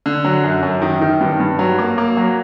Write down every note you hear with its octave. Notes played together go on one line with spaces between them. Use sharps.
D3
F#3
F#2
F#2
D#3
D#3
G2
G2
F#3
A#3
A#3
F#3